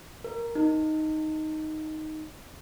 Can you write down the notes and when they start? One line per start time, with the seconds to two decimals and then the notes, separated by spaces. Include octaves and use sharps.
0.24 A#4
0.55 D#4